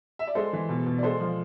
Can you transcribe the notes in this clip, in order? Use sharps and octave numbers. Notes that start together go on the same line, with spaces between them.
E5
D5
G#3 A4 C5
E3
B2
B2
D5
G#3 A4 C5
F3